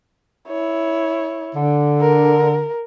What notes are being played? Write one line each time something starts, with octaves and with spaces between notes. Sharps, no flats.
E4 C#5
D3
A#4